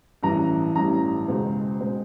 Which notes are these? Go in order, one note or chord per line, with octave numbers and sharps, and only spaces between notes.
A1 G2 E3 A#5
A1 G2 E3 A#5
C#2 B2 G#3 C4
B2 G#3 C4